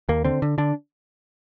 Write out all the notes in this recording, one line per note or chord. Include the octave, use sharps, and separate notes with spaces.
D#2 A#3
D3 C4
D3
D3 D4